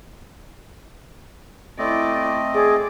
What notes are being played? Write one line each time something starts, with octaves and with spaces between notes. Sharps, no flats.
A3 C4 E4 D5 D#5
G#4 D5